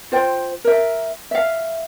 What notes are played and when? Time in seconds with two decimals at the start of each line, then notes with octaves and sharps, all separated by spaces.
0.12 F4 C5 G5
0.64 A#4 E5
1.31 E5 F5